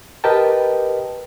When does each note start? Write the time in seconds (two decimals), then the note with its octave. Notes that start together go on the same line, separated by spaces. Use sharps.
0.24 G4 A#4 B4 D#5 G5 A5